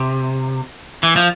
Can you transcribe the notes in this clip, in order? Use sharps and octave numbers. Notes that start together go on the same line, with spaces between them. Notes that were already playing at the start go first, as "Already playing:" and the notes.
Already playing: C3
E3
F3